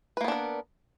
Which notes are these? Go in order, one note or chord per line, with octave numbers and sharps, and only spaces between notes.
A#3 B3 D4 A#4 B4